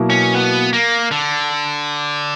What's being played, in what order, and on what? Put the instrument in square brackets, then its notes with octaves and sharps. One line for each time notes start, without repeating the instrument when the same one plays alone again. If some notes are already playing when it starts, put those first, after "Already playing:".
Already playing: [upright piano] B2 F#3 A#3 E4
[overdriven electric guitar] C#4
B3
A#3
D3